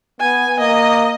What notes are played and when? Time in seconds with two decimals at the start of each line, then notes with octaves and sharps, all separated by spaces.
0.20 B3 G#5
0.60 A#3 D#5